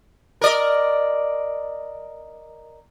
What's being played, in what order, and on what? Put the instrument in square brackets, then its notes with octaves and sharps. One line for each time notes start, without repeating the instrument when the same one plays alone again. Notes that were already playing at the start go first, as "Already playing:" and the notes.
[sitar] A#4 D5 D#5